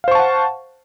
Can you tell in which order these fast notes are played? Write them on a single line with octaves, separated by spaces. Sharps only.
F5 C5 C#6 A5 F#5